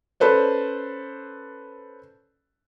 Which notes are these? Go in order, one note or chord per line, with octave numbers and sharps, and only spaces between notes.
C#4 A4 B4 C5 D5